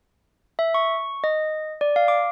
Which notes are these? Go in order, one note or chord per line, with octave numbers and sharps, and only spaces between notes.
E5
C#6
D#5
D5
F5
D6